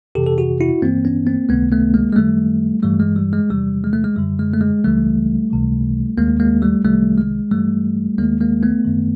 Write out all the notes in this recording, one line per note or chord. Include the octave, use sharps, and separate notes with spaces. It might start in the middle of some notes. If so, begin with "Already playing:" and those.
F2 C3 E3 G4 A4
A4
F#4 G#4
E4 F#4
G2 E3 A#3 C4
B3 C#4
A#3 C4
C#2 C3 D#3 A3 B3
A3 B3
G#3 A#3
G#3
F#2 D#3 G3 A3
G2 E3 G3 A3
G#3
G3
G#3
E2 C3 E3 G3
G#3
A3
G#3
F#2 D3 G3
G#3
A3
G#3
C#2 C#3 E3 G3 A3
C#2 C3 E3
D#2 D#3 G#3 A#3
G#3 A#3
G3 A3
C2 C3 D#3 G3 A3
G#3
G2 E3 G3 A3
D#2 D#3 G#3 A#3
G#3 A#3
A3 B3
F#2 D#3